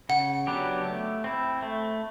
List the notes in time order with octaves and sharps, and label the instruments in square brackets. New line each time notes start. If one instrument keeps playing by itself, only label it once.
[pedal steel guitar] C#3 [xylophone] F#5
[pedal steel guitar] F#3 B3 D4 G4
A3
C4 E4
A3